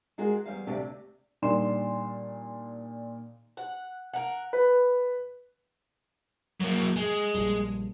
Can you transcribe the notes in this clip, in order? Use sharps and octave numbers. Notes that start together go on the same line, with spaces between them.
G#3 F4 F#4 G#4 A#4
E2 G3 F5
D2 C3 D4 G4
A#2 D#3 G3 D4 C6 E7
F#5
A#4 F#5
B4
F#3 A#3
G#3
A#1 G2